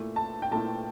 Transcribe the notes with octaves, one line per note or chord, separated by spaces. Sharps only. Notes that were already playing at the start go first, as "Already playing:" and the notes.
Already playing: A#2 A3 E4
A5
G5
A#2 A3 E4 A5